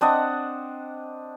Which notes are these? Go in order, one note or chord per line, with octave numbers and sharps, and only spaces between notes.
C4 D4 D#5 F#5